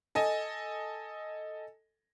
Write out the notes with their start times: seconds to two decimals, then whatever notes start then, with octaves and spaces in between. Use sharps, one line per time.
0.15 A4 D#5 G#5